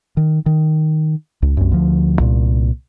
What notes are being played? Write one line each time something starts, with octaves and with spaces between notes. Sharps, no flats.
D#3
D#3
C#2
C2 F#2
D2 F3
C2 A#2